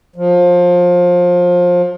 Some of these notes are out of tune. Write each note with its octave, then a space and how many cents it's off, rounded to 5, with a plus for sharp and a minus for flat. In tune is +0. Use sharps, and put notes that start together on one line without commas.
F3 +25